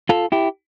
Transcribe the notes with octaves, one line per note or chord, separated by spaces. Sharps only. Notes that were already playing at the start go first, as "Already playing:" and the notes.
F4 A4
E4 G4